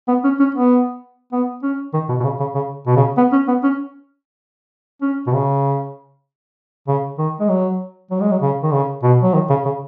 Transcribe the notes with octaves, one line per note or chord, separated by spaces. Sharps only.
B3
C#4
C#4
B3
B3
C#4
D#3
B2
B2
C#3
C#3
C#3
B2
C#3
B3
C#4
B3
C#4
C#4
B2
C#3
C#3
D#3
G#3
F#3
F#3
G#3
F#3
C#3
D#3
C#3
B2
F#3
D#3
C#3
C#3